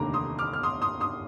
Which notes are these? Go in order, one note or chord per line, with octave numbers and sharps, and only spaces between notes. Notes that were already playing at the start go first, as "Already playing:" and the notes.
Already playing: F1 D#2 D3 A#5 D6
C6 D#6
D6 F6
F6
C6 D#6
C6 D#6
C6 D#6